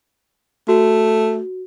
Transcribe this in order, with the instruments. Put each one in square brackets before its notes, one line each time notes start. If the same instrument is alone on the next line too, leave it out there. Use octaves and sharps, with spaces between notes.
[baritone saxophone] A3 [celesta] F#4